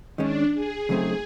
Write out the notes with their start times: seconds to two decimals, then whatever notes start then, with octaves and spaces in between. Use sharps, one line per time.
0.18 D#3 G#3 C#4 D4
0.54 G#4
0.89 C#3 F#3 A3 C4 D#4